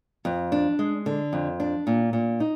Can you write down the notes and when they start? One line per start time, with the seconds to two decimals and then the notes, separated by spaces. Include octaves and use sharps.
0.25 F2
0.52 D4
0.79 G#3
1.06 D3
1.33 F2
1.60 D4
1.87 A#2
2.13 A#2
2.40 D#4